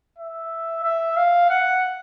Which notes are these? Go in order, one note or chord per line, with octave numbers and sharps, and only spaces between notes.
E5
E5
F5
F#5